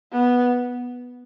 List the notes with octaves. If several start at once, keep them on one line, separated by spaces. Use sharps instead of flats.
B3